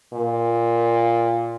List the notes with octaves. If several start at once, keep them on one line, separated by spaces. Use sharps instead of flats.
A#2